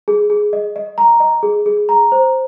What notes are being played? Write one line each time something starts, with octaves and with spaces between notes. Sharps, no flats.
G#4
G#4
D#5
D#5
A#5
D#5
G#4
G#4
A#5
C5